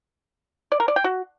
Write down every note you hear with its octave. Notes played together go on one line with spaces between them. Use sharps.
D5
A#4
D5
G5
F#4